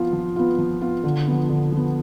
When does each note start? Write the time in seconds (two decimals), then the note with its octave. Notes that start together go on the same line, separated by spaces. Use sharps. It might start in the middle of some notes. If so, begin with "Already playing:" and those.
Already playing: F3 B3 F4
0.13 F3
0.36 B3 F4
0.58 F3
0.81 B3 F4
1.04 D3
1.27 F3 B3
1.49 D3
1.72 F3 B3